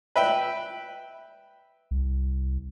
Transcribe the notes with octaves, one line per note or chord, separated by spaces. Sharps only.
B4 E5 G5
C2